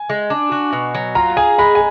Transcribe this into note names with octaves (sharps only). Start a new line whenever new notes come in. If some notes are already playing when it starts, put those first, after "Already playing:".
Already playing: G#5
G#3
D4
F#4
B2
F#3
F4 A#5
G#4 G#5
G#3 B5
G#5